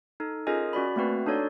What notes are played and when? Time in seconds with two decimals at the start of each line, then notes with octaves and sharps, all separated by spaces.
0.20 D#4 A4
0.47 C#4 F4 G#4 A#4 D#5 G#5
0.73 C#4 F#4 D5 B5
0.96 A3 A#3 C4 F#4 B4
1.26 D4 D#4 A4 C#5 D5